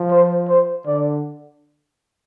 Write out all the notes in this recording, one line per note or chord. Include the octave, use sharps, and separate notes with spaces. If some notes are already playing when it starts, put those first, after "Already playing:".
Already playing: F3
C5
C5
D3 D5